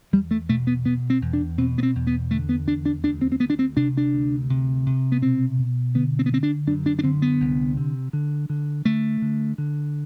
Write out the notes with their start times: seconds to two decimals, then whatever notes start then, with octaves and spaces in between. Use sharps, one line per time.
0.13 E2 G3
0.31 A3
0.49 B2 A3
0.67 B3
0.85 B2 B3
1.10 C4
1.22 E2
1.33 D4
1.58 B2 C4
1.78 B3
1.83 C4
1.95 E2
2.07 B3
2.31 D3 A3
2.49 B3
2.67 E2 D4
2.85 D4
3.03 D2 D4
3.21 C4
3.32 C4
3.40 D2 B3
3.50 D4
3.59 C4
3.76 C3 D4
3.97 D4
4.13 D2
4.50 C3
4.86 C3
5.12 B3
5.22 B2 C4
5.59 B2
5.94 D3 B3
6.19 C4
6.26 B3
6.32 D3 C4
6.43 D4
6.67 F#2 D4
6.86 D4
6.99 D4
7.03 D3 C4
7.22 B3
7.40 C2
7.77 C3
8.13 D3
8.50 D3
8.85 D3 A3
9.22 D3
9.58 D3